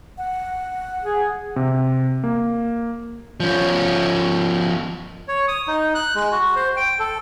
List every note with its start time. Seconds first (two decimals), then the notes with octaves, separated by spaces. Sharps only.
0.18 F#5
1.03 G#4
1.56 C3
2.24 A#3
3.40 F3 C#4
5.28 C#5
5.48 D#6
5.68 D#4
5.95 F#6
6.15 G#3
6.32 F#4
6.56 C5
6.77 G5
7.00 A4